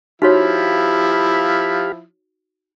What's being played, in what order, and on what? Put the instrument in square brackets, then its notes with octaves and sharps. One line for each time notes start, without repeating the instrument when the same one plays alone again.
[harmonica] F3 E4 [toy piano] D#4 F#4 C#5 [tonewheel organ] G4 F5 B5